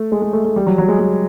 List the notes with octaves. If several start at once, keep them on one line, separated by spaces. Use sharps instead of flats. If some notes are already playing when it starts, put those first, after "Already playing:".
Already playing: A3
G#3
G#3
A3
A3
G3
F#3
F#3
G#3
G#3